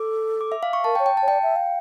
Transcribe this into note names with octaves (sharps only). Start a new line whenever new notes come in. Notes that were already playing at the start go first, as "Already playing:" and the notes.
Already playing: A4 D6
D6
E5
F5
C#6
A#4 A5
G5
C#5
G5
A5
C#5
D5 G5
E5
F5